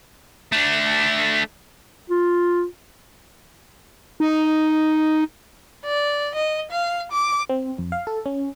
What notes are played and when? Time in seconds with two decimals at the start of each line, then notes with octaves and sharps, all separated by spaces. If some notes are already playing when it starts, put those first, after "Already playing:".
0.52 A3 D4
2.10 F4
4.20 D#4
5.85 D5
6.35 D#5
6.71 F5
7.12 D6
7.49 C4
7.78 F2
7.92 F5
8.07 A4
8.26 C#4